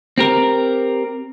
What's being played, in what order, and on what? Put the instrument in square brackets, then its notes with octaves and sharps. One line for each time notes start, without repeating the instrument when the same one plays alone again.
[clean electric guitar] C4 G4 A#4